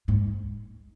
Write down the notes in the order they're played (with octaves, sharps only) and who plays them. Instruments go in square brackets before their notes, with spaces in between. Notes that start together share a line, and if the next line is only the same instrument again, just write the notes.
[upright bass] G#2